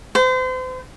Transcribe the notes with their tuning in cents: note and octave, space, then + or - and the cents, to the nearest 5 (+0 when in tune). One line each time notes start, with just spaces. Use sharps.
C5 -35